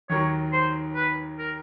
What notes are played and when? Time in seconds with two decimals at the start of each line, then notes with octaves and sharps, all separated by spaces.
0.09 D#2 D#3 F#3 C#5
0.53 C5
0.95 B4
1.38 A#4